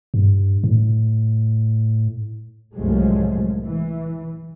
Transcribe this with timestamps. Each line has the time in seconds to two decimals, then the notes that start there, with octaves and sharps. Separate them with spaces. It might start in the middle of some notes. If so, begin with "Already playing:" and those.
0.14 G2
0.64 A2
2.74 C2 F#2 A2 F3 G#3 A3
3.64 E3